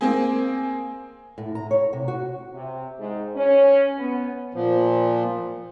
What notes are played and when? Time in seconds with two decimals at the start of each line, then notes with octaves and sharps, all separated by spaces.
0.01 A#3 C4 G#4
1.38 A2
1.55 A#5
1.71 C#5
1.93 C3
2.08 F#4
2.54 C3
2.99 G#2
3.36 C#4
3.98 B3
4.54 A#2 F3